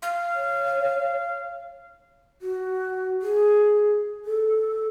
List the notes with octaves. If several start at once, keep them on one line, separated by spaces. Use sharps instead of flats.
F5
C#5
F#4
G#4
A4